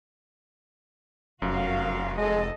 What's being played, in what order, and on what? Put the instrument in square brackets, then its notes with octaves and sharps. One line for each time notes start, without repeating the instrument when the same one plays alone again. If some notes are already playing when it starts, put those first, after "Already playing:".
[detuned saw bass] F1 [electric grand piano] F#2 [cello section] F#4 A#4 F5
[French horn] G#3 [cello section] A4 D#5